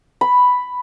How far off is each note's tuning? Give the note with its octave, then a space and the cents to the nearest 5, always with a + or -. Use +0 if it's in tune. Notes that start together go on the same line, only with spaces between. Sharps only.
B5 +5